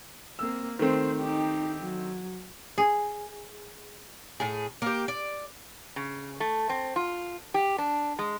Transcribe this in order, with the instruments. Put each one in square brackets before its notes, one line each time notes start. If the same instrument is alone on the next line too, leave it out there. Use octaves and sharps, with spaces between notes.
[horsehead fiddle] A#3 C4 [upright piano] E6
[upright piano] D#3 A3 C4 [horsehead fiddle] C5
[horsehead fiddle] D#4 G4
F#3
[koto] G#4
[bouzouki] A2 G#4
A#3 G4
D5
[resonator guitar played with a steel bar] C#3
A3
C4
F4
G4
D4
G#3